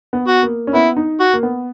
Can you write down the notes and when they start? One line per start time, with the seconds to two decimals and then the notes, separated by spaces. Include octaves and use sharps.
0.13 B3
0.28 F#4
0.43 A#3
0.67 C#4
0.74 B3 E4
0.97 D#4
1.20 F#4
1.33 A#3
1.43 B3